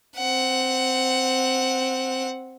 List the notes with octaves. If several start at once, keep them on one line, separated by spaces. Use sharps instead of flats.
C4 F#5